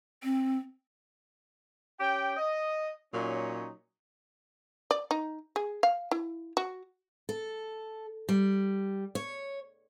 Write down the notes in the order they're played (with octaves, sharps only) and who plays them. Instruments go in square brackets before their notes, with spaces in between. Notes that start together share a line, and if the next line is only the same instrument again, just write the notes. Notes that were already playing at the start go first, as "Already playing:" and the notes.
[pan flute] C4
[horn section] C#4 G4 G5
D#5
A#2 F#3 C#4 D#4
[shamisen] D5
D#4
G#4
F5
E4
F#4
[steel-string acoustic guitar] A4
G3
C#5